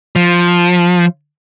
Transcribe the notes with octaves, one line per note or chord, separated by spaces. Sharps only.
F3